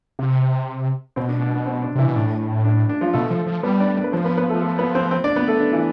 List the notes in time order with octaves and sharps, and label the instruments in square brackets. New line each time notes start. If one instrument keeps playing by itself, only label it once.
[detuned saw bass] C3
[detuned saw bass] B2 [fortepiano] C4
[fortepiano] D4
D4
D4
C4
D4
[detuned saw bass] C3 [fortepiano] E3 E4
[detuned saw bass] B2
[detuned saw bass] A2 [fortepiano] D4
[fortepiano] D4
D4
F3 F4
[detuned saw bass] B2 [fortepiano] A3 A4
[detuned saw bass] F3
F3
[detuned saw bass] G3 [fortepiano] B3 B4
[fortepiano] D4 D5
D4 D5
B4
[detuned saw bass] F3 [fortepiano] C4 C5
[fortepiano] B3 B4
B3 B4
A3 A4
A3 A4
B3 B4
C4 C5
C4 C5
D4 D5
B3 B4
A3 A4
D4
E3 E4